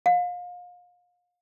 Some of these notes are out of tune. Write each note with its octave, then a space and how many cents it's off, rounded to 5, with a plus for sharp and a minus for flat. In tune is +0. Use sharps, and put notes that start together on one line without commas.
F5 +35